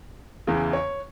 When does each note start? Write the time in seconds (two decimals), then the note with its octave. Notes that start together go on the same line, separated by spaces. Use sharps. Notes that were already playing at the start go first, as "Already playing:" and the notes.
0.47 E2 C#3 E3
0.73 C#5